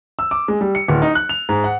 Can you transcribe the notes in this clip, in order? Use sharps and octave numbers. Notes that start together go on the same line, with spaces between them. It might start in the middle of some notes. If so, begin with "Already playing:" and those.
E6
D6
G#3
G3
C#7
D1
D#4
F#6
F7
G#2
F#5